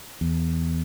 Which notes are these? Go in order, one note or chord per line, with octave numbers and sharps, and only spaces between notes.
E2